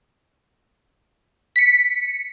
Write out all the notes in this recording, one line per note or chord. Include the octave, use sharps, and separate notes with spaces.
B6 C#7